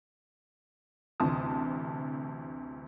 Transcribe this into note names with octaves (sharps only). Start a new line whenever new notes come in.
A1 D2 C3 A5 D#6